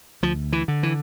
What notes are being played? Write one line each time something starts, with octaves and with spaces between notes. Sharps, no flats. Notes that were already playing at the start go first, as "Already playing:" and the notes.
D2 F3
E3
D3
E3